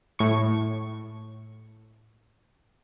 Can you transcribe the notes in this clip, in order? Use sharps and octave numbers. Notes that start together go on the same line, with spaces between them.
A2 C#6